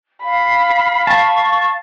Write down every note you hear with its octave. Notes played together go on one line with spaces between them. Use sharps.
F5 B5
A5 C#6